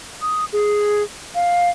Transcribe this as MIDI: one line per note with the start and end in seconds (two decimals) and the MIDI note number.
0.22 0.45 87
0.53 1.03 68
1.35 1.70 77